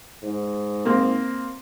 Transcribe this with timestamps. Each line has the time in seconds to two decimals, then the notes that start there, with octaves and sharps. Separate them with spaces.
0.23 G#2
0.85 A#3 C4